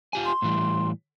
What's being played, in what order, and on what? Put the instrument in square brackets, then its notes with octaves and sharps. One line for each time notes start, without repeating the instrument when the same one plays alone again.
[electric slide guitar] F4 G4 G#5
[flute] C6
[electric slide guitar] A2 E3 G3